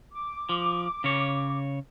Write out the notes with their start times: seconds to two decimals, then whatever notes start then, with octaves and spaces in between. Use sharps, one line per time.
0.12 D6
0.49 F3
1.04 C#3 C#5